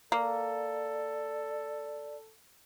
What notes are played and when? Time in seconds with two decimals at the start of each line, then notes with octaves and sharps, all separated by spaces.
0.12 A#3 A4 D5